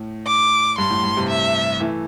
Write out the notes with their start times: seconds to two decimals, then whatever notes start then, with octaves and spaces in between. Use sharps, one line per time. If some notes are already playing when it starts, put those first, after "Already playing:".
Already playing: A2
0.27 D6
0.78 G2 C6
0.90 A2
1.03 G2
1.17 G2 C3
1.29 E5
1.80 E3 A3